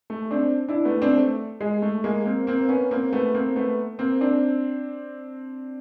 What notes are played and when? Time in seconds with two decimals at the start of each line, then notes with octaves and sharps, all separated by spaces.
0.10 A3
0.31 C4 D4
0.68 D4 E4
0.85 A3 B3
1.02 C4 D4
1.17 A3
1.61 G#3
1.82 A3
2.04 G#3 A#3
2.25 A#3 C4
2.47 A#3 C4
2.61 C4
2.69 B3 C#4
2.91 A#3 C4
3.13 A3 B3
3.34 A#3 C4
3.56 A3 B3
3.99 A#3 C4
4.21 C4 D4